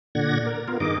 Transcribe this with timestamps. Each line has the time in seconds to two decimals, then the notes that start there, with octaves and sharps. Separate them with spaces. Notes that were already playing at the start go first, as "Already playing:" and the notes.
0.15 A#2 D3 D5 F#5 G#6 A#6
0.46 A#4
0.68 B3 F4 A#4
0.80 G2 D#3 D#4 G#4 D#5 D6